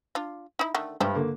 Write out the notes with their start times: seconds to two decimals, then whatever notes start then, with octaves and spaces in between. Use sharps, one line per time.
0.15 D4 F4
0.59 D#4 E4
0.74 D3 D#3 A3
1.00 G2 G3 A3 C5
1.15 D3 A#3